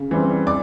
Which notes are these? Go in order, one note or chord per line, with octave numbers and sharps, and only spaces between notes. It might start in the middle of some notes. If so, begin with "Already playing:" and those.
Already playing: C#3
E3 G3 C4
D5 D6